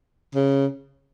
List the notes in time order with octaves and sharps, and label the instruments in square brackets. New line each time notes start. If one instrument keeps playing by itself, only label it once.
[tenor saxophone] C#3